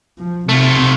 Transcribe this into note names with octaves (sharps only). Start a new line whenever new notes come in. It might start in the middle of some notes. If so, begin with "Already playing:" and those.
F3
C3 A3 F4